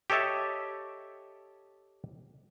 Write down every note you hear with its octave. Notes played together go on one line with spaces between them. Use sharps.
G4 A4 C#5 D#5 E5 A5